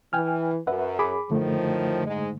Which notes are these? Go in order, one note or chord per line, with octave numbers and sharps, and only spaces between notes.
E3 G5 G#5 F6
F#2 B4 E5 F#5
G#4 B5 D6
F#2 A2 D3 D#3 F3 A3
G#2 G#3